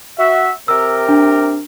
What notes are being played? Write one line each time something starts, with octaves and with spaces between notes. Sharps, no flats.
F#4 E5
C3 G4 A#4 E6
D4